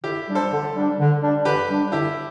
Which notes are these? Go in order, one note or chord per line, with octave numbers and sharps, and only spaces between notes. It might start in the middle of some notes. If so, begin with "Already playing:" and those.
D3 E4 G4
G3 D4
A4 C5
D3
G3 D4
D3
G3 D4
D3 G4 B4
G3 D4
D3 E4 G4